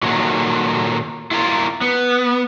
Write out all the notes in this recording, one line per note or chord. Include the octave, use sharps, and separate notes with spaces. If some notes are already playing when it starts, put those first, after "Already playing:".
A#2 D3 D#3 F#3
E4 F4 A#4
B3